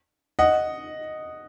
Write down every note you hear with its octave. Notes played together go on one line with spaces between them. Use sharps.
D#5 F#5